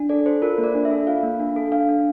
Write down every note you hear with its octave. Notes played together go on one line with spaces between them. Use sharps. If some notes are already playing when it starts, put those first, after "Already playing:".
Already playing: D4
A4 D5
A4 C5
F4 A#4
A#3
D5
D4
E5
A4
F4 F5
A#3
D4
A4
D4 F5
D4